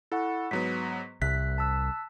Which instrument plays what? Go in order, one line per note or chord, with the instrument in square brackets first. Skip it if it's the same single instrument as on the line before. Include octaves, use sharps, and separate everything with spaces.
[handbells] E4 F#5 C#6 [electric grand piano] A4
[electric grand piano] G#2 F#3 B3 [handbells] B6
[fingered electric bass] C2 [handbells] E5 F#6 [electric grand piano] B6
[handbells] A5 E6 F#6